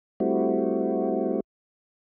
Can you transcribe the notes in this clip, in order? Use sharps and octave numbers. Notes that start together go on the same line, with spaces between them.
G3 A3 C4 E4 F#4